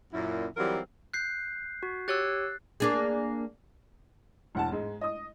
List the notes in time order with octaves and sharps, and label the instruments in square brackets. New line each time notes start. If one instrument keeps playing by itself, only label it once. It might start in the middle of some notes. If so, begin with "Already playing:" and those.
[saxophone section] F#2 A#2 E4
E3 F#3 G3 C4 F4 A#4
[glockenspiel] F#6 G6 C7
[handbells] F#4
[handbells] G4 C#5 E6 [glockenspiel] F#6 A6
[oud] A#3 D4 G#4
[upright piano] E1 F#5 A5
G#2 G#3
D#5 D#6